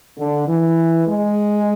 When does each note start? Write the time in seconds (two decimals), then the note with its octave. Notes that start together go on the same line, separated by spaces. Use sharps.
0.18 D3
0.48 E3
1.07 G#3